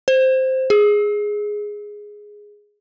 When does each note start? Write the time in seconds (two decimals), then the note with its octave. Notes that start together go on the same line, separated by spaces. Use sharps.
0.08 C5
0.70 G#4